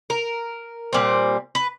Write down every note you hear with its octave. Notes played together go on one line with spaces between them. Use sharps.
A#4
A#2 G3 C4
B4